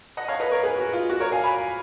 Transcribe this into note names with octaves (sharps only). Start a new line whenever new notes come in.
D#5 F#5
C#5 F5
B4 D#5
A#4 C#5
G#4 B4
F#4
F4
F#4
A#4 C#5
F5 G#5
G#5 B5